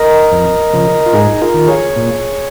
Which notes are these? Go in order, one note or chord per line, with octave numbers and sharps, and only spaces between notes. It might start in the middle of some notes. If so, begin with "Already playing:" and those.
Already playing: A#4 D#5
F2
C#3 F3
F4
G#2 D#4 G#4
F4 A#4
D#3
G#4 C#5
A#2